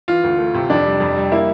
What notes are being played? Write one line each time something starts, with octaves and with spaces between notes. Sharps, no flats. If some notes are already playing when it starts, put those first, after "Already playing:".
E3 F4
D2
A3
C3
F2 D4
G3
F2
G3
A#3 E4